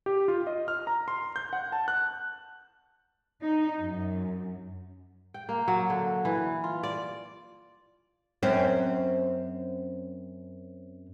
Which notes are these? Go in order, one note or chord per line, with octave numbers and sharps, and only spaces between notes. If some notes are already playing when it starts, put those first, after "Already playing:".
G4
F4
D#5
F6
A#5
C6
G6
F#5
A5
F#6
D#4
F#2
G5
A#3
F#3
D3
E3
F4
D5
F#2 C4 C#4